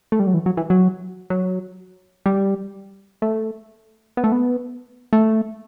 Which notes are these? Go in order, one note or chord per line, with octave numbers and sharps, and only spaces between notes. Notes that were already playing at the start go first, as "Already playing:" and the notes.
A3
G3
F#3
E3
F#3
E3
F#3
F#3
G3
A3
B3
A3
B3
A3